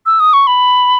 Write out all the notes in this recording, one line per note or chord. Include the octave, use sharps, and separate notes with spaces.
E6
D#6
C#6
B5